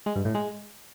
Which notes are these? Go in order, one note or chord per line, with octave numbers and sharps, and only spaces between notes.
G#3
G2
A2
G#3